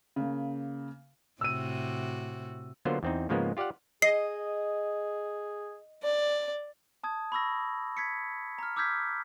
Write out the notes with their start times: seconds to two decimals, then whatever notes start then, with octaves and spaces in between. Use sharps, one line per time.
0.16 C#3 A#3
1.41 A2 C3 F#4 E6 D#7
2.85 D3 F#3 A#3 B3 F4 C5
3.03 E2 C4 D#4
3.29 G#2 C#3 F3 G#3 A#3 B3
3.57 F4 G4 D5 F5 F#5
4.02 G#4 D#5 C7
6.03 D5
7.04 A5 D#6 G#6
7.32 B5 C#6 E6 A#6
7.97 G#6 B6 C#7
8.59 A#5 F6
8.76 D6 E6 F6 G6 G#6 B6